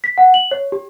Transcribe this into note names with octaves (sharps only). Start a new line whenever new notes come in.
B6
F#5
F#7
C#5
G4